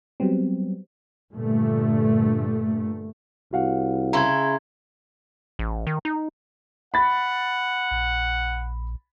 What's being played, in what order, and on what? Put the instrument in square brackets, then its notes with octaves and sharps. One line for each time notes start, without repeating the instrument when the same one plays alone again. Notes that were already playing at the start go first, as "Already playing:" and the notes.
[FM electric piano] F#3 G3 B3 C4
[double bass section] G2 A#2 D3 A3
[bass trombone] C2 [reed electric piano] F#4 F5 F#5
[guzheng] C#3 E4 [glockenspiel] A#5 C6 G#6
[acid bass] A1
D#3
D#4
[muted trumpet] F#5 [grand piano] B5 A6
[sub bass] A#1